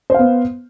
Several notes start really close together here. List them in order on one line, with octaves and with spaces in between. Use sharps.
C5 F5 B3